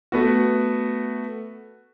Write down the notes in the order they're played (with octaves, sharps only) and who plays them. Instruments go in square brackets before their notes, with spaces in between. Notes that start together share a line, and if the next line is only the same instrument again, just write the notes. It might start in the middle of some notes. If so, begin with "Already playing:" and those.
[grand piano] A3 B3 F#4